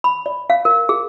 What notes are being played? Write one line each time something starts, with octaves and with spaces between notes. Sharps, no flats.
B5
D5
F5
A#4
G#4